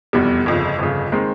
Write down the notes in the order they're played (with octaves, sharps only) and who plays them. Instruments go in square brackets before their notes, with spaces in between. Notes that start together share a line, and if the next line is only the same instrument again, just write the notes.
[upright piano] F1 E2 B2 G3
G1 F2 C#3
G1 F2 C#3
D#3 G#3 C4